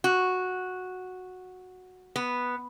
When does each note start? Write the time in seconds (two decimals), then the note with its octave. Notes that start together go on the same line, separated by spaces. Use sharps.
0.04 F#4
2.16 B3